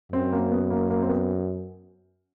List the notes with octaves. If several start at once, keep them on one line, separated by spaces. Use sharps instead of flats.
F#2 C4
A#3
B3
A#3
A#3
C4
B3